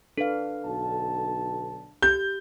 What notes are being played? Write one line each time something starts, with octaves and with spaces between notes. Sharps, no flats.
D4 A4 B4 F5
B1 D3 A5
G4 G6